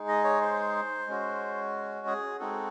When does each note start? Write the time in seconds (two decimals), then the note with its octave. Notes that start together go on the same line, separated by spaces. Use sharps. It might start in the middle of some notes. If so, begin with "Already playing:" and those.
Already playing: G#3 D#4 G#4
0.08 D#5
0.24 C#5
0.41 C5
1.07 G#3 C#4 F#4
2.07 G#4
2.40 G#3 C4 D#4 F#4 A4